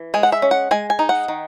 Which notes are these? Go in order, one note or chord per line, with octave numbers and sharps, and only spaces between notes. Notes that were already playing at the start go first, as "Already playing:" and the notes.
Already playing: E3
G#3 G#5
F#5
E5
C#4
F#5
G#3 G#5
G#5
D#4
F#5
D#3